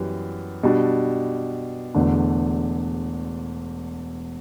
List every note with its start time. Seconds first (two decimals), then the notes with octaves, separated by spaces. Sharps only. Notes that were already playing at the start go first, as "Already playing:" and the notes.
Already playing: F#2 E3 G3 B3
0.63 B2 G3 D4
1.95 E1 E2 D3 A3 D4